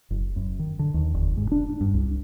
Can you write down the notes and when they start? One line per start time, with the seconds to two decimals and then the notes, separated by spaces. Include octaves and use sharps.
0.10 F#1
0.36 F#2
0.59 D#3
0.79 D3
0.94 D#2
1.14 F1
1.37 G#2
1.52 D4
1.81 G2
1.94 C2